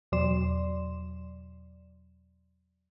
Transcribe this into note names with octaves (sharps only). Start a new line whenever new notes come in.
E2 B2 F#3 D5 C6 E7